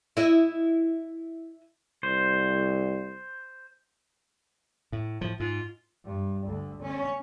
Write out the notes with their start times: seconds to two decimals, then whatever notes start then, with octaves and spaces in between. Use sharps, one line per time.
0.17 E4 D#5
2.03 C2 C5
4.92 A2
5.21 A2 F3
5.40 G#2 F4
6.04 G2
6.46 D2
6.82 C#4